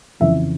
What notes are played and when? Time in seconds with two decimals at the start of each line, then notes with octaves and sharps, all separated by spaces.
0.20 F2 C#3 E3 E5